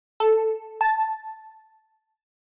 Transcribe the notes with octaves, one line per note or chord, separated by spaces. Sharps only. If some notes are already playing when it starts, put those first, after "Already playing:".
A4
A5